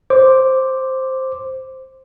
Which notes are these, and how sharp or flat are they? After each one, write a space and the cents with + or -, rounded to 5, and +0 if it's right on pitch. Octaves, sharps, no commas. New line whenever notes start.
C5 +5 D6 +0